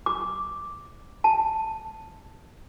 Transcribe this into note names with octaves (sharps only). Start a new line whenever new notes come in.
D6
A5